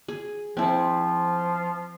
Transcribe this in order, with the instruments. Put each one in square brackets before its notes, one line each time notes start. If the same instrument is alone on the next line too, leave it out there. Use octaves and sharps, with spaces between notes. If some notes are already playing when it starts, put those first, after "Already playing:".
[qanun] G#4
[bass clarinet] F3 [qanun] C4 E4